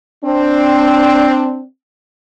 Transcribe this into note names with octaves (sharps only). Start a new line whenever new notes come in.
C4 D4